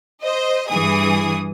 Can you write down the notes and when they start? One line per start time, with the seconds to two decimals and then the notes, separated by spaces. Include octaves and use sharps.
0.23 C5 D#5
0.69 G2 E3 G#4 D#6